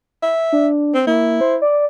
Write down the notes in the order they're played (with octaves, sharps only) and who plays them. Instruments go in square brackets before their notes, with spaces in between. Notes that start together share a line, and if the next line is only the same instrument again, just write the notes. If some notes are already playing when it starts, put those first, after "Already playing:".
[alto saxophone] E5
[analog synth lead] D4
[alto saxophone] C4
[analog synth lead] A#3 [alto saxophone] E4
[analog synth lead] C5
D5